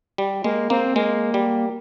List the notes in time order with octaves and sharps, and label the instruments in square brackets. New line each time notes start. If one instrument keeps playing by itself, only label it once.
[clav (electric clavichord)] G3
[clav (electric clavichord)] G#3 [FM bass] A#3
[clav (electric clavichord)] A#3 [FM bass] C4
[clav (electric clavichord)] G#3 [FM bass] A#3
[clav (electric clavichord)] G3